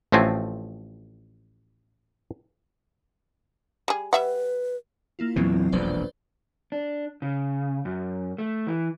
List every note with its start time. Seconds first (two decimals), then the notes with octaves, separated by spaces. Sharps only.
0.12 A1 F3 A3 C4 G#5
3.88 G3 G#4
4.13 G3 B4 E5 F#5
5.19 A#3 E4 F4
5.36 E2 A#2 E3 F#3 C4
5.72 E1 A#1 F2 B4 C5 D5
6.72 D4
7.22 C#3
7.85 F#2
8.38 A3
8.67 E3